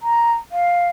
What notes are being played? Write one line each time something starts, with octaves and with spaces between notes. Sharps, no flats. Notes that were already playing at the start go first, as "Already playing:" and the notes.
A#5
F5